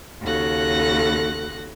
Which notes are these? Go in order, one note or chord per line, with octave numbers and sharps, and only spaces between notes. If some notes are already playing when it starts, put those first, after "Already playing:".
D#2 C#3 F#4 A4 F#6 A#6